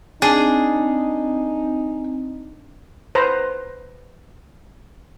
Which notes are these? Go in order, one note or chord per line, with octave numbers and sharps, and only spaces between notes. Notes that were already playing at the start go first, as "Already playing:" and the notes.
C4 D4 D#4 G#4
B4 C5 A#5